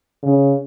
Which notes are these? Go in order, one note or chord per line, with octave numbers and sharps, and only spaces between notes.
C#3